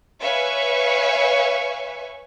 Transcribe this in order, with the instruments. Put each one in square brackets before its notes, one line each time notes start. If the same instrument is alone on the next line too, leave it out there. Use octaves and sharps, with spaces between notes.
[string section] B4 C#5 E5 F5 G#5 C#6